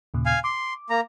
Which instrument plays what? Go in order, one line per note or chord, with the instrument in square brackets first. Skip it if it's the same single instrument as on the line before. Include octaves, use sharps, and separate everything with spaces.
[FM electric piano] D#2 A#2 C#3
[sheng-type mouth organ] F5 G#5
[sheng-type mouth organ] C6 [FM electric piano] D6
[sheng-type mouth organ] A#3 A#5